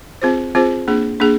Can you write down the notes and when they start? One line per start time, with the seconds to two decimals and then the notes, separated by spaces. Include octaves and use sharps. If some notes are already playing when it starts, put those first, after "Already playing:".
0.22 C4 F4 G#4 C5
0.55 C4 F4 G#4 C5
0.88 A#3 D4 G#4
1.20 A#3 D4 G#4